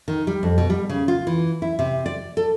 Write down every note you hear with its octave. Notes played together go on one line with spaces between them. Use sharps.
D#3
G3
F2
B2
G3
C#3
F4
E3
E4
C3
D5
A4